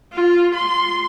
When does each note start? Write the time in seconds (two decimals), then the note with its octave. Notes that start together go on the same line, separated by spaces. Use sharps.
0.13 F4
0.55 C6